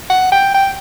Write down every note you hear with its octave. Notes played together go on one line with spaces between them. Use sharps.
F#5
G5
G5